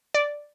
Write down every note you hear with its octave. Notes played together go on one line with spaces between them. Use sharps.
D5